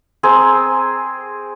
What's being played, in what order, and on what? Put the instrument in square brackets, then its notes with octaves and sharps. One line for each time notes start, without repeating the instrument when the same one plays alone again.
[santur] C4 G#4 A#4 C5